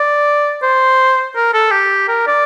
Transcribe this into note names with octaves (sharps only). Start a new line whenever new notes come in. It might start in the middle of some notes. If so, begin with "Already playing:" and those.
Already playing: D5
C5
A#4
A4
G4
A#4
D5